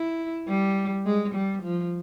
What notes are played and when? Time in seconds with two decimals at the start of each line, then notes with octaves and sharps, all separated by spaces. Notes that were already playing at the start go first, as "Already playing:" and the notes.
Already playing: E4
0.48 G3
1.06 G#3
1.34 G3
1.63 F3